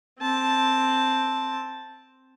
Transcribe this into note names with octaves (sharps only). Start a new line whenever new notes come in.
C4 A5